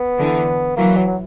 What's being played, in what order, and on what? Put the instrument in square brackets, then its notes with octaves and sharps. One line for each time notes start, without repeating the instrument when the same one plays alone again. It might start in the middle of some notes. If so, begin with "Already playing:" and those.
Already playing: [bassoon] B3
[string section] D3 E3
[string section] E3 F#3 [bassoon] A#3
[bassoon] F#3
F#3